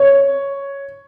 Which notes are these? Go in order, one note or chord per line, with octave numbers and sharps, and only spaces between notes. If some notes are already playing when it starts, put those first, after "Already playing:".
Already playing: C#5